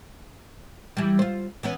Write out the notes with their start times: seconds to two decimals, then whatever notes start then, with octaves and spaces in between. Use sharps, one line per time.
0.97 E3 G3
1.19 F4 C5
1.63 E3 B3 C#4